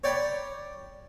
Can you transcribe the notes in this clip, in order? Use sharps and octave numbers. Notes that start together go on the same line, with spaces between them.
C#5 D5 G5 A#5 B5